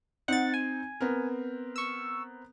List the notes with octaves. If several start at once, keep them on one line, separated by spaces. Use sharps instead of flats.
C4 D#4 F#5 A6
G#5
B3 C4 A#4
C#6 E6